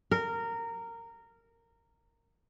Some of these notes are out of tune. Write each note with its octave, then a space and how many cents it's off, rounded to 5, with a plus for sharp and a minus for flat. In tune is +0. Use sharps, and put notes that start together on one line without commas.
A#4 -15